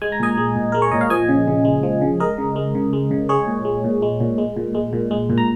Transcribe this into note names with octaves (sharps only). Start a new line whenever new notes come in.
G#3 G#5
A#5
A#2 D#5 G#5
G#3
A#2
G#3 A#4
C#5
A#2 D#5
F5
F3 D#5 G#5
C#3
C#3
G#3
F3
C#3
G#3 A#4 D#5
C#3
G#3
C#3
G#3
C#3
G#3 G#4 C#5
A#2
G#3
A#2
G#3
A#2
G#3
A#2
G#3
A#2
G#3
A#2
A#5